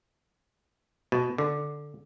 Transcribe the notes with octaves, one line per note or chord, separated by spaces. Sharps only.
B2
D3